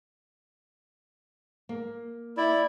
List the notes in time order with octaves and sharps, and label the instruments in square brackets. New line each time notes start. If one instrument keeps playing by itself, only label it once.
[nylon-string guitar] A#3
[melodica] E4 [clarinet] D5